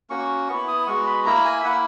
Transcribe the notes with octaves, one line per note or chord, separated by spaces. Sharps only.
A#3 C#4 F#4 C#6
B3 E4 C#6
D#6
G#3 B3 F#4 C#6
B5
A#3 E4 A#5
G#5
E5
A#3 E4 F#5